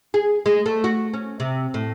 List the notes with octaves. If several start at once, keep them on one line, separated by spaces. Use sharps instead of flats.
G#4
G#3
A3
F#4
C#4
C3
A2